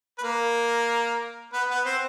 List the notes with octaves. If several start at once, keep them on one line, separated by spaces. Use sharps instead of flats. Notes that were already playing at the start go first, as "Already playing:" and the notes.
B4
A#3 A#4
B3 B4
B3 B4
C4 C5